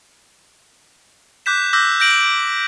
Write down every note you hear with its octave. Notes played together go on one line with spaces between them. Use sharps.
D6 F#6 G6 B6 E7
D6 E6 F#6 G6 A#6 B6
G6 A#6 D7 F#7